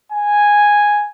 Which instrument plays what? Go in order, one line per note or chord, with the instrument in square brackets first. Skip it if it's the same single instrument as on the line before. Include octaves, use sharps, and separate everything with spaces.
[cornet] G#5